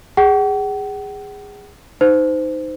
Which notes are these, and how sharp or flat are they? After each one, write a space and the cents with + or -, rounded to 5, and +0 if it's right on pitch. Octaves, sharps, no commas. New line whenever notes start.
G#4 -20 F#5 +40
D#4 +0 C5 -25